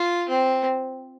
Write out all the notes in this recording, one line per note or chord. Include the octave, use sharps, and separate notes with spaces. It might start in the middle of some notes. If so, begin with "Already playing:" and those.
Already playing: F4
C4